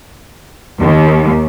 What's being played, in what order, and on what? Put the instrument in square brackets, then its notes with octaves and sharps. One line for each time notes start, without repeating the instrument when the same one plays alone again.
[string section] D#2